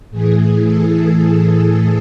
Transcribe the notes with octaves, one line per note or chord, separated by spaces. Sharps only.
A2 E3 G#4
A4